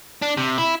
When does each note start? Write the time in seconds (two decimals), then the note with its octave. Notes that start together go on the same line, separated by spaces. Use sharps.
0.22 D4
0.37 C3
0.58 E4